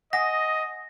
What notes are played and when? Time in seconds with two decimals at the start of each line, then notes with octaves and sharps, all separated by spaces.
0.13 D#5 F#5 G#5 D#6 A#6